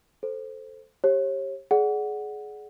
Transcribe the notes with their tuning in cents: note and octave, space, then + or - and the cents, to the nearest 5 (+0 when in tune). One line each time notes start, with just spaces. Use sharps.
A4 +0 C5 +0
G4 +0 C#5 -35
G#4 +25 D5 +0 F#5 +0